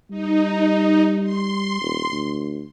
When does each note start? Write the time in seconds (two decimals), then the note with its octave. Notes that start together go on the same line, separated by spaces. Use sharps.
0.10 G3 D#4
1.23 C6
1.81 D#1
2.12 D2